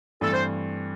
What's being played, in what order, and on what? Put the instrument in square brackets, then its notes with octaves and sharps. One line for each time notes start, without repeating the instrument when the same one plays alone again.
[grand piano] G2 E3 A3 C4 [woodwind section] A4
[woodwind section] C5